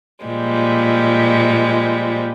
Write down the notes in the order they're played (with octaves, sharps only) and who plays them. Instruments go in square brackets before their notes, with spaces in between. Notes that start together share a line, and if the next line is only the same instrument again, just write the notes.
[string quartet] A#2 F3 G3 G#3